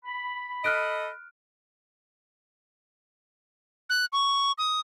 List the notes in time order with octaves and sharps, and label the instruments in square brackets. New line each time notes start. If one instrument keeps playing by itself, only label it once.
[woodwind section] B5
[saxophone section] A4 D#5 [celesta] F6 F#6 D7
[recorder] F#6
C#6
D#6